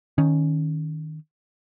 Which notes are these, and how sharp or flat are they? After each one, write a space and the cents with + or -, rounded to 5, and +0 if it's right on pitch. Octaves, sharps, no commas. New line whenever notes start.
D#3 +0 C#4 +0